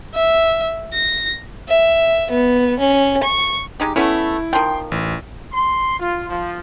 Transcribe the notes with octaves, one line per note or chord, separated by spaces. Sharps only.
E5
A#6
E5
B3
C#4
C#6
G#3 D#4 G4
A3 B3 C#4 E4
D#3 F3 G5 C6
A1
C6
F4
F3